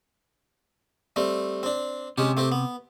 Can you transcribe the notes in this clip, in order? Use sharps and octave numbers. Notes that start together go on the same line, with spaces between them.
G3 A3 C4
C4 D4
C3 G#3 C#4 G4
A3 C4 G4
B3